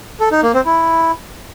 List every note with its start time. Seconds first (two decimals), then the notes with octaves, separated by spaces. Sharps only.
0.20 A4
0.31 D#4
0.43 A#3
0.54 C4
0.65 E4